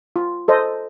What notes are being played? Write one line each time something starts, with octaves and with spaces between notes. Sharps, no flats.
F4
A4 C5 D#5